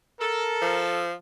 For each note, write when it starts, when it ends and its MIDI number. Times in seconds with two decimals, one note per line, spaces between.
0.20 1.02 69
0.20 0.84 70
0.62 1.13 53